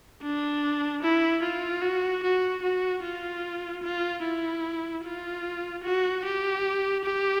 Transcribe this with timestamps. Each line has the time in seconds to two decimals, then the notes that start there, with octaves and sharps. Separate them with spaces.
0.23 D4
1.03 E4
1.43 F4
1.82 F#4
2.23 F#4
2.63 F#4
3.03 F4
3.83 F4
4.23 E4
5.04 F4
5.84 F#4
6.25 G4
7.05 G4